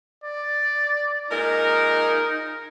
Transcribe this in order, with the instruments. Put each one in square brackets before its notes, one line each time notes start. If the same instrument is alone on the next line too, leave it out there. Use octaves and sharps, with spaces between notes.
[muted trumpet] D5
[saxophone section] A#2 G#3 A#4 [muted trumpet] D#4